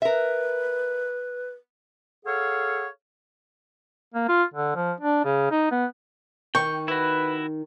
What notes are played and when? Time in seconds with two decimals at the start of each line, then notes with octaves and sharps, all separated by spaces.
0.02 A#4 B4 E5
2.25 G#4 A4 C#5 F5 F#5
4.14 A#3
4.29 F4
4.54 D3
4.76 F3
5.01 D4
5.25 C#3
5.51 D#4
5.71 B3
6.55 D#3 G5 C#6
6.88 E4 F#4 B4